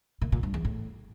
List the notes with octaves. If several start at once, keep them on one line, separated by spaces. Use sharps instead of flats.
A#2
A#2
G2
E2
A2